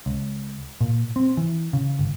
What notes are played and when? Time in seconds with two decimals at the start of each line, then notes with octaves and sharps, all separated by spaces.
0.06 C#2
0.81 A#2
1.16 C4
1.37 E3
1.73 C#3
1.99 G1